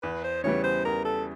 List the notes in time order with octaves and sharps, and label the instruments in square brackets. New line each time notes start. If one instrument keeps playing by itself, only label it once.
[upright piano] E2 [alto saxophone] B4
[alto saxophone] C5
[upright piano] C#3 E3 G3 B3 [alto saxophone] C#5
[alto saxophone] C5
[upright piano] E2 [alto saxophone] A#4
[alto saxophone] A4